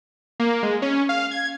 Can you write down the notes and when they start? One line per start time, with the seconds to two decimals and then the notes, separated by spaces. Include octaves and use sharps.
0.40 A#3
0.63 G#3
0.82 C#4
1.09 F5
1.31 G#6